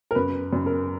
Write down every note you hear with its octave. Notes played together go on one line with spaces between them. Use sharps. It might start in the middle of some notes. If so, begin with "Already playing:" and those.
A#4
F#2 B4
F#2
A#4